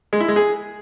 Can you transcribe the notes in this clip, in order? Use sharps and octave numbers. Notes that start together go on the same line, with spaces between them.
G#3
E4
G#3
G#4